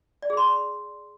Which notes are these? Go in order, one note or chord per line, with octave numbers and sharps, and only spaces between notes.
D5
G#4
C6